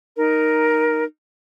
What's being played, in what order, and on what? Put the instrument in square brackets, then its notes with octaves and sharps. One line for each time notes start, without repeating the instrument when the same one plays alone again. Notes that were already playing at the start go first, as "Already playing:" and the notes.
[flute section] D#4 A#4